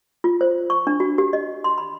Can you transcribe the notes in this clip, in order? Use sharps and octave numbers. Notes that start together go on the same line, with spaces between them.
F4
C5
C#6
D4
F#4
G4
D#5
C6
B5